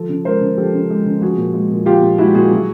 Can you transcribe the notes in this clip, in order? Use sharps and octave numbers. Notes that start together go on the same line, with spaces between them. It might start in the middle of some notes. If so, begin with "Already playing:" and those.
Already playing: F3 A4
C#3
G#3 A#4 C5
C#3
F3 G4 A4
C#3
G#3
C#3
F3 F#4 G#4
A#2
G#3
A#2
F3 F4 G4
A#2
G#3 E4 F#4
A#2 F#4 G#4
F#3